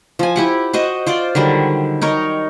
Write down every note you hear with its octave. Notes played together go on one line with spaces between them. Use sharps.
F3 G#5
E4 G4 F#5
F#4 C5 D#5
F4 C5 D5 C6
D3 D#3 F#3 G3
D#4 A#4 C#5